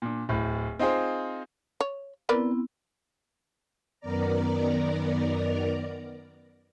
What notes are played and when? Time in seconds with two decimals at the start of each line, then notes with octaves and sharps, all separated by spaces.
0.02 A#2 D4
0.29 D1 A2
0.79 C4 D#4 F4 G#4 C5
1.81 C#5
2.29 B3 C4 E4 A#4 B4 D5
4.00 F#2 D#3 B3 A#4 D5 A#5